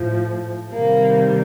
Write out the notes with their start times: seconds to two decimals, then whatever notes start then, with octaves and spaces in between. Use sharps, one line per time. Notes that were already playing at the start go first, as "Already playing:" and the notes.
Already playing: A2 F3
0.73 C3 D#3 G3 A#3